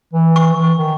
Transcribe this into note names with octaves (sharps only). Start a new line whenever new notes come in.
E3
C#6
E3
D#3